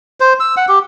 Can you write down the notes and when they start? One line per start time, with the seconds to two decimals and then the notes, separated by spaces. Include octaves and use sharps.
0.20 C5
0.40 E6
0.57 F#5
0.68 G4